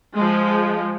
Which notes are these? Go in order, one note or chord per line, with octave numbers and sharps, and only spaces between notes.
F3 G#3